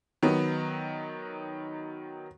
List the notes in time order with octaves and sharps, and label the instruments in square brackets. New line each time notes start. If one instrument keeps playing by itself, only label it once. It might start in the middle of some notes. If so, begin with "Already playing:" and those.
[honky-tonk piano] D#3 F#3 B3